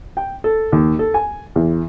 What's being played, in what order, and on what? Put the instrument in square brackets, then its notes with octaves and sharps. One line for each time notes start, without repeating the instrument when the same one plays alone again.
[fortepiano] G5
A4
D#2
A4
G#5
E2